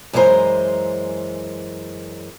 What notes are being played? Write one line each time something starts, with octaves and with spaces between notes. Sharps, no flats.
F#2 E3 G#3 G#4 C5 A#5